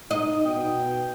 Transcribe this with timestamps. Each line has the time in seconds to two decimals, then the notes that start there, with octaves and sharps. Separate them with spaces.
0.11 D#4 D#5
0.45 B2 G5